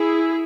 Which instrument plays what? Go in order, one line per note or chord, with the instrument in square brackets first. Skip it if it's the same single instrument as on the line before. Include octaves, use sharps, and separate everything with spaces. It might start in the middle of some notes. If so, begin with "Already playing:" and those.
Already playing: [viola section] E4 G#4